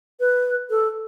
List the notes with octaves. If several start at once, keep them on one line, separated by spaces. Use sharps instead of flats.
B4
A4